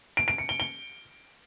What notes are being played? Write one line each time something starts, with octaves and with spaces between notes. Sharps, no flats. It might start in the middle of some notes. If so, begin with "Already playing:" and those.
D7
D7
C#7
G7
G7